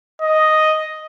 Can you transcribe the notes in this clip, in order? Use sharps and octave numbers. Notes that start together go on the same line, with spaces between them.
D#5